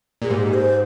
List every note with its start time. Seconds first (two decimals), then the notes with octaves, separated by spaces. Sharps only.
0.22 A#2 G#4
0.30 G#2 G4
0.54 C5